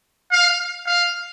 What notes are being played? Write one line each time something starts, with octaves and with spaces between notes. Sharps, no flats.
F5
F5